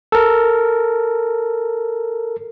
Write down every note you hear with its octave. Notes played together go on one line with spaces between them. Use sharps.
A4 A#4